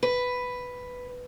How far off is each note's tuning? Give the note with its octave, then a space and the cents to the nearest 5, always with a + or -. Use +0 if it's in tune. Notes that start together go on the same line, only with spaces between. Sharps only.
B4 +5